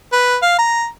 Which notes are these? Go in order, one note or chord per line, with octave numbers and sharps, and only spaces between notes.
B4
F5
A#5